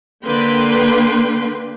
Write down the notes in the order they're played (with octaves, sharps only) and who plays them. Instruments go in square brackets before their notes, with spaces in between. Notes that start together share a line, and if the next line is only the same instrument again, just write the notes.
[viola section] D3 A#3 B4 G5 C6